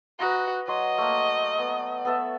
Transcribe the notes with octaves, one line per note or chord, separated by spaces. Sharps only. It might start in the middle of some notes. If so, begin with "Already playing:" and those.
F#4 B4 D#5 A#5
F#3 D#5 C6
A3 A#3
B3
B3 A4 E5